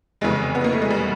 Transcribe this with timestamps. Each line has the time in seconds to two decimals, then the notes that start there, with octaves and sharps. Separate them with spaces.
0.21 F1 E2 C#3 E3 G#3
0.55 B3
0.64 A#3
0.72 A3
0.82 G#3
0.91 G3